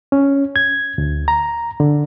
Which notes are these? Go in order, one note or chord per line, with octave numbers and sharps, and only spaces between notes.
C#4
G#6
D2
A#5
D3